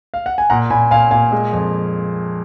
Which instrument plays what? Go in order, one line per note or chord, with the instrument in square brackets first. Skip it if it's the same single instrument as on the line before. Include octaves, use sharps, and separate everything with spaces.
[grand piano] F5
F#5
G#5
A#2 F#5 A#5
A#2 G#5 B5
A#2 F5 G#5
A#2 F5 G#5
G#3
F2